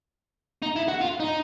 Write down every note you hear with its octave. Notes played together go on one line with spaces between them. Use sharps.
D#4
E4
F#4
F4
D#4